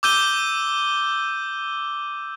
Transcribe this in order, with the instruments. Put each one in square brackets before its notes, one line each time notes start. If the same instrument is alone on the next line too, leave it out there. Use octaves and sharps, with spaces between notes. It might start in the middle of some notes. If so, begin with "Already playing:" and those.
[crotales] D6 E6 G6 D#7 G7